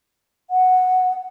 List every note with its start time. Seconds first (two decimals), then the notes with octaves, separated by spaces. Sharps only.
0.50 F#5